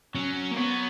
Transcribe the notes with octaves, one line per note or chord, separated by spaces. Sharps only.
F#3 C#4
A#3
F#3 B3